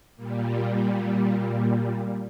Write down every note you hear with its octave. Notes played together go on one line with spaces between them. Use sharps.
A#2 G3